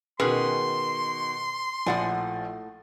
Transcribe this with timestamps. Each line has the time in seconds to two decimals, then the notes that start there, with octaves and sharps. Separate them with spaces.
0.20 B2 D#3 C#4 G#4 B4 C6
1.86 A#1 A2 F3 F#5 G#5 A6